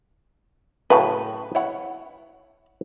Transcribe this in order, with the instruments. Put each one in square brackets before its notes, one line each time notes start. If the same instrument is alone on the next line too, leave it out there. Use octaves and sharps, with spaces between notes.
[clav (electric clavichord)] F#2 A2 C#3 [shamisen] B4
[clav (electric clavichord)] E4 C#5 F#5